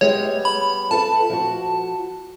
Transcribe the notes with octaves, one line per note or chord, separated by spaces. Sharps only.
G3 G#3 B3 C#5
B5
F4 A4 B4 A5
F3 F#4